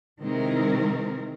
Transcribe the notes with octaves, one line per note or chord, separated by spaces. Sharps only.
C3 D#3 E3 G#3 C4 A#4